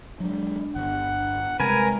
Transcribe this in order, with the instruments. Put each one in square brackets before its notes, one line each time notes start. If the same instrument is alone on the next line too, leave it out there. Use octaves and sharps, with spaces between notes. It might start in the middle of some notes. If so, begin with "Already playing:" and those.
[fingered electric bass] F#3 G#3 [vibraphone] D4
[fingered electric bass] G1 [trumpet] F#5
[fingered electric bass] C3 G3 [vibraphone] G#3 [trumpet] A#4 [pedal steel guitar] B4 G#5